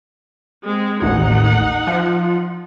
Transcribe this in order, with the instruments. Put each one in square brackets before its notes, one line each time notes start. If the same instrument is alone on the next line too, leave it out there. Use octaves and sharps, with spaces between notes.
[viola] G#3 C4
[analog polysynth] A1 D#2 [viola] D#4 F#5
[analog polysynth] F3